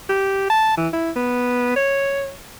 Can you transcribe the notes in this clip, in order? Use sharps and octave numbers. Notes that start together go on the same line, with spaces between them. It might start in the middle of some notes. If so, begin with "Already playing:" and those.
G4
A5
E3
E4
B3
C#5